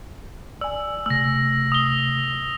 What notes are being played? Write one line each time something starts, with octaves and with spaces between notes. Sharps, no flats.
D5 G#5 E6
C3 A3 E6 A#6
D#6 G7